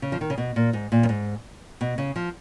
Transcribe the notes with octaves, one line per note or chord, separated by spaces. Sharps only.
C#3
F3
D#3
C#3
B2
A#2
G#2
A#2
F#2
G#2
B2
C#3
F3